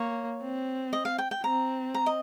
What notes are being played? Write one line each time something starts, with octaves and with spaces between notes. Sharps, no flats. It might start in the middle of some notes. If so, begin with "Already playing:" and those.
Already playing: A#3 C#5
C4
D#5
F5
G5
G5
C4 A#5
A#5
D#5